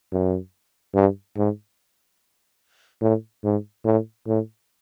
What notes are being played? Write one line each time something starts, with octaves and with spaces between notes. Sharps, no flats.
F#2
G2
G#2
A2
G#2
A2
A2